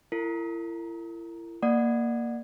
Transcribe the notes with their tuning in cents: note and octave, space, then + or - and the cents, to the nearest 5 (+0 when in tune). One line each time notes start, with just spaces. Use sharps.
E4 +35 A#4 -40
A#3 +0 D5 +25 F#5 -10